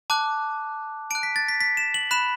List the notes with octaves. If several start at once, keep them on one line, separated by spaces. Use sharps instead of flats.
A5 D6 F#6
A5 F#6 D7
B6
A6
B6
B6
E7
F#7
B5 F#6 E7